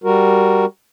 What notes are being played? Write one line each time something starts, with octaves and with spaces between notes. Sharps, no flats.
G3 F#4 A#4